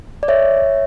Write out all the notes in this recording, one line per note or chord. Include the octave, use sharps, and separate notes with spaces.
D5
C#5 E5